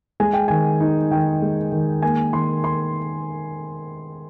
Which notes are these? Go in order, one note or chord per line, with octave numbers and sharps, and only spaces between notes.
G#3 G#5
G5
D#3 G#5
D#4
D#3 G5
G#3
D#3
A#3 G#5
D#3 C6
C6